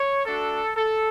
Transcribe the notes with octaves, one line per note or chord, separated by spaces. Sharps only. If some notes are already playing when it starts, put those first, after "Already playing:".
Already playing: C#5
A3 D4 F#4 A4
A4